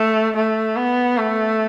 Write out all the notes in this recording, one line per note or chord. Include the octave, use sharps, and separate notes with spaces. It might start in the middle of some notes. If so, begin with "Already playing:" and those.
Already playing: A3
A3
B3
A3